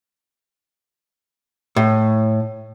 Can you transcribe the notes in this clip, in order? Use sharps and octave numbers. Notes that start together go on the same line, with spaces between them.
A2